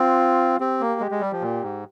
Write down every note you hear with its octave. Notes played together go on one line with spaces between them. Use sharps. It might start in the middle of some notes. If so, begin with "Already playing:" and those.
Already playing: C4 F4
C4 G4
A#3
G#3 G4
G#3
G3
F3
A#2
G#2